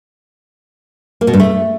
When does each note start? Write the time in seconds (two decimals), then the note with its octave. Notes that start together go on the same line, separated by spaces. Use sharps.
1.21 A#3
1.27 B2
1.33 G2
1.40 A3